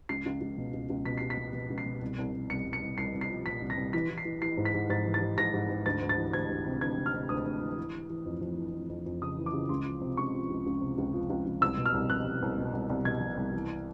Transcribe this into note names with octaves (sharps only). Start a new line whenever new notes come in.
C#2 C7
C#2
C#2
B2
C#2
C#2
B2 B6
C#2 C7
B6
B2
B2
C#2
C7
B2
C2
C2
C2
C2 C#7
C2
C#7
C2
C2 C7
C2
C7
F3
A#2 B6
C2
A#6
C2
E3 B6
E3
C7
E3
E3 C7
G#2
B6
G#2
G#2 A6
E3
A6
G#2
G#2 A#6
G#2
G#2
D2 A6
D2
A6
E3
D2 G#6
D2
C3
D2 G#6
C3
F6
C3
D2 D#6
D2
E3
E3
E3
E3
F2
F2
E3
F2
F2
F2
C#3 D#6
E3
D6
C#3
C#2 C6
F3
C3
C#2 C#6
F3
C#2
C#2
C3
C#2
F3
C#2
C#2
C2 E6
B2
F6
C2
C2 F#6
C2
C2
B2
C2
C2
B2 G#6
B2
C2
E3